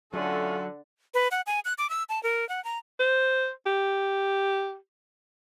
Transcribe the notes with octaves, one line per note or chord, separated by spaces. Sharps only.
D3 F#3 A3 C#4 F4 A4 F#5
B4
F#5
G#5
F#6
D6
E6
A5
A#4
F#5
A#5
C5
G4